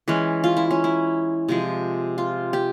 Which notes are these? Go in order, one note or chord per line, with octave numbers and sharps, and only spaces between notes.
E3 G#3 C#4
F4
E4
C#4
E4
C3 F3 G#3
F4
G4